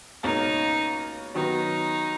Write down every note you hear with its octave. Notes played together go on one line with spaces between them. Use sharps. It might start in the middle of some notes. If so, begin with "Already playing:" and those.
C#2 B2 A#3 C#4 D#4 G#4
D#3 F#3 B3 D#4